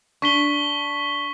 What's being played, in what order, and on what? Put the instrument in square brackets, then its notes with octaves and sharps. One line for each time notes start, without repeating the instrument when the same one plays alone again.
[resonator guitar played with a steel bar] D4 [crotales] C#6 B6 G7